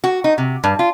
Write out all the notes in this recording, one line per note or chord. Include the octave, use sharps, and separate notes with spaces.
F#4
D#4
C3
G2
F4